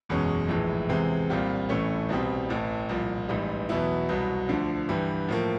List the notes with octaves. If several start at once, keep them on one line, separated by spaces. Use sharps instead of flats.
F#1 E2 B2 G#3 C#4
A#1 A2 E3 G#3
E2 C3 E3 G#3 C4
C2 A#2 G3 C4 F4
A1 A2 E3 A3 C#4
C2 B2 G3 C4
A1 A2 E3
C2 A#2 F3
A1 G#2 E3 G3
E2 B2 F#3 B3 E4
C2 B2 F#3
D2 D3 F3
G2 E3 G3
A2 F3 A#3